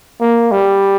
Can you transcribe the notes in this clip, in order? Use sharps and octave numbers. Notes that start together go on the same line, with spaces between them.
A#3
G3